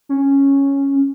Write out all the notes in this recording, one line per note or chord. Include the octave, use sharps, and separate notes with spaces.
C#4